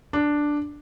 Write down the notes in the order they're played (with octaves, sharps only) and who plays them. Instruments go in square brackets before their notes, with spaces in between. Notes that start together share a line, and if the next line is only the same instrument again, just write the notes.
[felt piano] D4